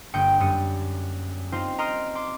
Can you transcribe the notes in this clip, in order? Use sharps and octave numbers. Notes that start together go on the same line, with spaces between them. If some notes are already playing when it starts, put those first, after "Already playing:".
G1 A#3 G5 D#6 C#7 D7
F#2 G3 D#6 C#7
C4 D#4 F4 C5
D#5 A#5 C6 D#6 F6 D7
C6 D6